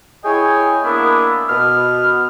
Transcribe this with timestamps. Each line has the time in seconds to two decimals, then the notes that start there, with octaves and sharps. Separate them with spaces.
0.24 E4 G#4 C#5 D#5 G5 G#5
0.84 A#3 B3 D4 E4
1.48 B2 B3 F6